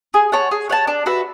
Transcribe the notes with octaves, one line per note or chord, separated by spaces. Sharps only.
G#4
C#5 F#5 A5
G#4
C#5 F#5 A5
D4
F#4 B4 E5